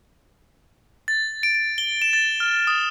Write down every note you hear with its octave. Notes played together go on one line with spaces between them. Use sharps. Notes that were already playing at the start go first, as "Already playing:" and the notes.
A6
D7
D7
G7
E7
A6
F6
D#6